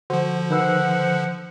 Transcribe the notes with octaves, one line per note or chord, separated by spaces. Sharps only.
D3 F3 F#4 C5
D#3 B4 C5 F#5 E6